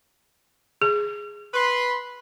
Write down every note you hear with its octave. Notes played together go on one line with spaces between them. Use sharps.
G#4
B4 B5 C6